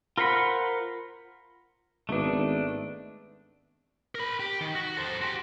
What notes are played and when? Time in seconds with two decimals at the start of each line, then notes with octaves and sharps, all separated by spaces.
0.17 F4 A#4 C5 F#5 B5
2.09 G#1 A3 B3 D4 D#4
4.15 A#4 B5
4.40 G4
4.61 D#3
4.75 F#4
4.97 A4 C5
5.21 F#4 G4